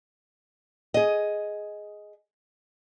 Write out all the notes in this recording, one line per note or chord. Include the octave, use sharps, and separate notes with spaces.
G#4 D#5